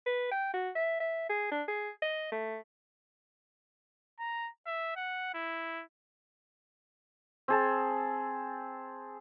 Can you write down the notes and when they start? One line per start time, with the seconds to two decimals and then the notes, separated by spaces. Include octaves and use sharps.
0.06 B4
0.31 G5
0.53 F#4
0.75 E5
1.00 E5
1.29 G#4
1.51 D4
1.68 G#4
2.02 D#5
2.32 A3
4.19 A#5
4.66 E5
4.96 F#5
5.34 E4
7.48 C4 G#4 A5